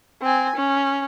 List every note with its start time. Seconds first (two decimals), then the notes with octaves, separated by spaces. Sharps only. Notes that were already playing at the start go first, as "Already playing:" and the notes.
0.22 C4 G#5
0.56 C#4